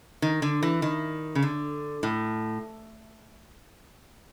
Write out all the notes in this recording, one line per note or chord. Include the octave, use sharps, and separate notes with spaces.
D#3
D3
E3
D#3
C#3
D3
A2